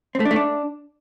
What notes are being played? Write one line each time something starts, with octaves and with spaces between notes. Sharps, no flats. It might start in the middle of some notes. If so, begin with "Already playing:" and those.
C4
A3
D4
A3
D4